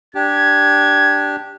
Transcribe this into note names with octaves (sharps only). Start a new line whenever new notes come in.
D4 G4 G#6